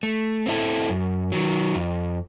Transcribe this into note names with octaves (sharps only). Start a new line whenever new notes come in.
A3
C4 E4 A4
F#2
D#3 F#3
F2